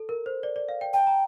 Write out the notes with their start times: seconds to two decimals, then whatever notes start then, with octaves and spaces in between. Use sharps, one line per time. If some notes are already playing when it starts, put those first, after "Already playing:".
Already playing: A4
0.09 A#4
0.26 C5
0.43 D5
0.56 D5
0.69 F5
0.81 G5
0.93 G5 A5
1.07 A#5